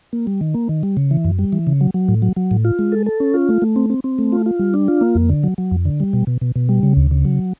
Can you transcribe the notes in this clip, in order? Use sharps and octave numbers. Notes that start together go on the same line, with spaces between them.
A#3
G3
D#3
A#3
D#3
G3
C#3
E3
F#2
G3
E3
C#3
F#3
F#3
A2
F#3
F#3
A2
F4
G#3
A4
A4
C#4
F4
A3
A3
C4
C4
C4
A3
F4
F4
G3
D4
F4
A#3
F2
D3
F#3
F#3
F2
D3
G3
B2
B2
B2
B2
G3
C#3
D2
C#3
F#3